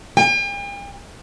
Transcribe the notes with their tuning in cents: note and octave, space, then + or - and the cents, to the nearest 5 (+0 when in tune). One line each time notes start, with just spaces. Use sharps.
G5 +45